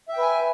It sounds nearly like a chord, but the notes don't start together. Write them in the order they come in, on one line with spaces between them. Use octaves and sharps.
E5 G5 B4 G#5